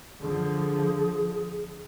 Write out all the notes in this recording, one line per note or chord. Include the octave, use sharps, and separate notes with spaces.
D3 F3 G#4